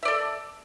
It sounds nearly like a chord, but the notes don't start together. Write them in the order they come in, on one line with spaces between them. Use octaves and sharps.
E5 D5 A4